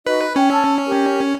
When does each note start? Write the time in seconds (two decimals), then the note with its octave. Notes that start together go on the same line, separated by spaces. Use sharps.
0.07 D#4 F#4 B4 D#5
0.36 C#4 G5
0.52 A5 E6 G#6
0.87 G4 A#4